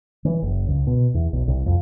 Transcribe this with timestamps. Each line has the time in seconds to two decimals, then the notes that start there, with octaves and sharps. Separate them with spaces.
0.25 E3
0.42 F#1
0.68 C#2
0.87 B2
1.14 E2
1.33 B1
1.48 C2
1.66 F2